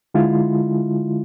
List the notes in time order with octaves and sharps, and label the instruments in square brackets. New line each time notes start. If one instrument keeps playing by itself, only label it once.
[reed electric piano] D3 G#3 E4 F4